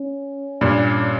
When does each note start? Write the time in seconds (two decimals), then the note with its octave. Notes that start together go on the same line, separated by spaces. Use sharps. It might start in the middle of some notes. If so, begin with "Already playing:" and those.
Already playing: C#4
0.61 G2 A#2